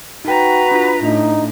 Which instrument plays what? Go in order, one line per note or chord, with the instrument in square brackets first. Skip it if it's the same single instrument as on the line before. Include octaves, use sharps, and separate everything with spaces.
[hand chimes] D#4 G5 [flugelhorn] F#4 [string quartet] B4 A#5
[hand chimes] D4 F4 B6
[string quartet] A2 [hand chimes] D4 [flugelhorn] D#4